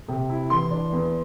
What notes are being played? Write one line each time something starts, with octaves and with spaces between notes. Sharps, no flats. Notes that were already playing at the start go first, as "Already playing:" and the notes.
C3
E4
E3 C6
D4
E2